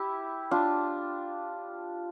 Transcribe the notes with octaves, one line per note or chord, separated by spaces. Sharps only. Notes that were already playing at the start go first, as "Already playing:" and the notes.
Already playing: E4 G4
D4 F4